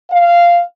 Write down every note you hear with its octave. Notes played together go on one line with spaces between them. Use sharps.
F5